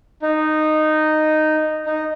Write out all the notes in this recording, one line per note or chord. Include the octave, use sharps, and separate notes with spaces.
D#4
D#4